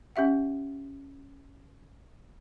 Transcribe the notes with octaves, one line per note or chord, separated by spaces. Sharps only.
C#4 G4 E5 F#5